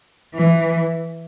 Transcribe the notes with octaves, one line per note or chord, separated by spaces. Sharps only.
E3